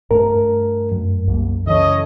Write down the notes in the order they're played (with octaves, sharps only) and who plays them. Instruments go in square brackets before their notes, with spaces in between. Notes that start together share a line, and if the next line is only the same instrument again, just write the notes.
[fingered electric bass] G2 A3 [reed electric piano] A#4
[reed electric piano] F#2
[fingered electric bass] C2 G3 A#3
[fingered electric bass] C#3 E3 [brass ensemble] A4 C#5 D#5